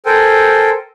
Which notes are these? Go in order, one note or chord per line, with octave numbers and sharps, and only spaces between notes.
A4 A#4 C5 G5 G#5